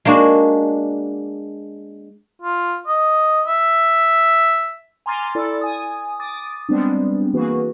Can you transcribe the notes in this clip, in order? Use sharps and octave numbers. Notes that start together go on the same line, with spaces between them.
G#3 A#3 D4 F#4
F4
D#5
E5
G#5 A#5 C6 D6 F6 A6
E4 A4 D5 A6
G#5 D#6
D6 D#6 A6
G3 G#3 B3 C4 D4
E3 A#3 F#4 G#4 B4